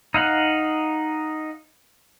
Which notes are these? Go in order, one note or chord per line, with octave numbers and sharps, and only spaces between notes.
D#4 F5 F#5